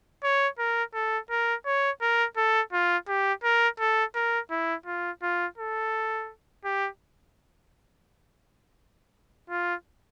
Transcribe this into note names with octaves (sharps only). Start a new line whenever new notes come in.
C#5
A#4
A4
A#4
C#5
A#4
A4
F4
G4
A#4
A4
A#4
E4
F4
F4
A4
G4
F4